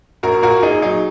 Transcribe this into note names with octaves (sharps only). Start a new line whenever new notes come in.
A#1 F#4 A#4
A#2 F#4 A#4
A#1 D#4 G#4
F#3 D#4 G#4